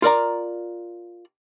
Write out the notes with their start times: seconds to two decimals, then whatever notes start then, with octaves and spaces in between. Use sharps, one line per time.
0.02 F4 A#4 D5 A#5